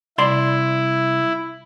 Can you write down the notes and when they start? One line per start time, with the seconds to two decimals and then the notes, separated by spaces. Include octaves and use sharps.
0.18 C2 E4 D5 C6